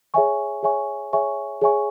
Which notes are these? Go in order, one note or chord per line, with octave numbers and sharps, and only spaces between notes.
G#4 C#5 E5 G#5 C#6
G#4 C#5 E5 G#5 C#6
G#4 C#5 E5 G#5 C#6
G#4 C#5 E5 G#5 C#6